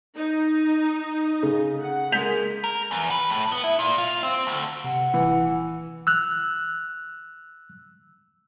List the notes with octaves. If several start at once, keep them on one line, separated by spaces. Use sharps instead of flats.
D#4
C#3
F#5
G#3 A#3 G6 B6 F7
A#4
E2
B4
A2
B3
E4
A#2
F4
C4
D2
C3 F#5
D#1 E3
E6 F#6